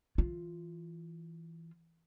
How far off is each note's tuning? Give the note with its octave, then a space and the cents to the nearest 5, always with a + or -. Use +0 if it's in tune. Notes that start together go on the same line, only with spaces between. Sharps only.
E3 +0 F4 +0